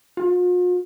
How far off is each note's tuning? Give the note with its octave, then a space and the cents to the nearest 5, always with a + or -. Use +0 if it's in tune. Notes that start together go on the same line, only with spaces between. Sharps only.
F4 +45